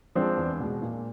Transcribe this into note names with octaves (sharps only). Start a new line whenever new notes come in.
F3 G#3 C4 D4
E2
B2 G#3
A#2